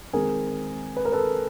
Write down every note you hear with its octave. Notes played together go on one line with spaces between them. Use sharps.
D#3 G#3 C4 G#4 A#4
B4
A#4
A4 B4